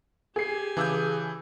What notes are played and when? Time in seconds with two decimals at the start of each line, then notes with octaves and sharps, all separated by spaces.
0.36 G4 G#4 G#5 C7
0.77 C#3 E3 G#4 A5 D6 E6 G6